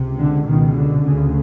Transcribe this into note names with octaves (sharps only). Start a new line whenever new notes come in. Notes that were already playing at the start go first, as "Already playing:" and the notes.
Already playing: C#2 C3
D3
C#2 B2 D#3
D3
D2 C#3